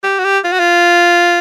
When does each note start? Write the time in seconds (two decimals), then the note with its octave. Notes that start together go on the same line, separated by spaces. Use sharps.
0.04 G4
0.19 F#4
0.25 G4
0.44 F4
0.52 F#4
0.60 F4